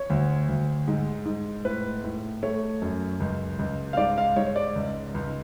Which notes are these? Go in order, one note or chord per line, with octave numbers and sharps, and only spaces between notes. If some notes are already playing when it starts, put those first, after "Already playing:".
Already playing: C#5
D2
D2
G#2
G#2
A2 B4
A2
A3 C#5
F#2
C#2
C#2
F5
G#2 D5
F5
G#2 C#5
C#5
D5
C#2
C#2